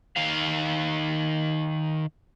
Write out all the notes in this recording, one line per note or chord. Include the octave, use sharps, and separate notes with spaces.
D#3 F5